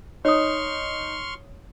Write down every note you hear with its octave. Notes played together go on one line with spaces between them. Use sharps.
D#4 C#5 C6 C#6 D#6 F6